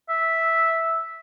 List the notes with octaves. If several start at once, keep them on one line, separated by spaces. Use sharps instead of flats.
E5